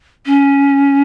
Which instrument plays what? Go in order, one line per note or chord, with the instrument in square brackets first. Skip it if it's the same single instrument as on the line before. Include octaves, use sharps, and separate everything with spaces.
[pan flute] C#4